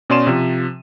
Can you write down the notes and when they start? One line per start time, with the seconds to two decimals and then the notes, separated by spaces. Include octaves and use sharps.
0.10 B2 C#4 D5 C6 D#7 E7
0.27 C3 F3